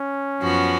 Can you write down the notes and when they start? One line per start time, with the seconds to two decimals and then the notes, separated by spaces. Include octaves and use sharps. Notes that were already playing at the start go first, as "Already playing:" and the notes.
Already playing: C#4
0.39 F#2 F3 B3 F#4